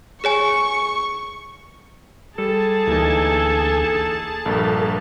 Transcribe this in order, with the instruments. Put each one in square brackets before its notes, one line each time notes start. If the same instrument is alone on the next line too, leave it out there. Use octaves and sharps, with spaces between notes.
[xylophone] G#4 C#5 G#5 [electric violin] C#6
[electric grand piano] G3 [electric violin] G#4 A5 [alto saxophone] A4
[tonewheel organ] D2 G#5 [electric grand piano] E3 A#3 D#4
[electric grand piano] A#1 G2 [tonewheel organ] A4 A#4